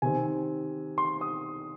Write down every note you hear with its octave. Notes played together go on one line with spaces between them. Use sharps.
C3 D#3 C4 G#5
C6
D#6